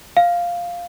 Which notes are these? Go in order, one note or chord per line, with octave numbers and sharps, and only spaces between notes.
F5